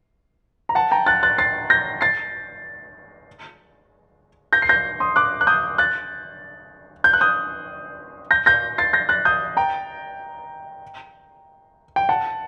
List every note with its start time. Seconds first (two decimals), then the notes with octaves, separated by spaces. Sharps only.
0.69 A#5
0.75 F#5 A5
0.91 G5 A#5
1.06 F#6 A6
1.23 F#6 A6
1.38 A6 C7
1.70 G6 A#6
2.01 A6 C7
4.53 G6 A#6
4.62 C7
4.69 G6 A#6
5.00 C6 D#6
5.16 D6 F#6
5.41 F#6
5.47 D#6 G6
5.78 F#6 A6
7.04 G6
7.13 F#6
7.21 D#6 G6
8.31 G6 A#6
8.46 G6 A#6
8.78 A6 C7
8.93 G6 A#6
9.09 F#6 A6
9.25 D#6 G6
9.57 G5 A#5
11.96 G5
12.09 F#5 A5